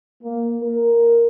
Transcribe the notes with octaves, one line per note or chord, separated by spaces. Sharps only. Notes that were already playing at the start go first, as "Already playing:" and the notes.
A#3
A#4